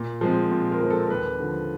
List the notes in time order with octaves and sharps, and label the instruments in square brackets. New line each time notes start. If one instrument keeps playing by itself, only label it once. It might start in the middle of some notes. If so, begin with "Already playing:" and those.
Already playing: [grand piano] A#2
F3 G#3 C4
A#2
A#4
F3 G#3 C4
A4
A#4
D#2 B4
D3 F3